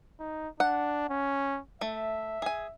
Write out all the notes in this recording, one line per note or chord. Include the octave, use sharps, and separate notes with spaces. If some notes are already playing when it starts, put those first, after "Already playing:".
D#4
D4 F#5
C#4
A3 E5
G#4 G#5